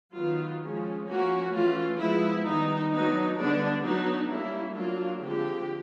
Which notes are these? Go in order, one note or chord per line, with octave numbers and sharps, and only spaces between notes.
D#3 F#3 B3 F4
F3 G#3 C#4
F3 A#3 C#4 F#4
E3 A3 C#4 F4
F3 G#3 B3 E4
D#3 G3 B3 D#4
F#3 B3 D4 D#4
D3 G3 B3 D4
F#3 B3 D4 D#4
G3 A#3 C#4 E4
F#3 A#3 D4 F4
D3 F3 G#3 C4 G4